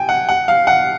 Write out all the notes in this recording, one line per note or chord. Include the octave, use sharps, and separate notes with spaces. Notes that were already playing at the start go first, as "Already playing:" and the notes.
Already playing: G5 G#5
F#5
F#5
F5
F#5